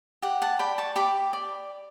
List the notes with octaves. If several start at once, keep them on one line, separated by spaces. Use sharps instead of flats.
G4 F#5
F#5 A5
D5 G5 B5
A5 C#6
G4 B5 D6
D5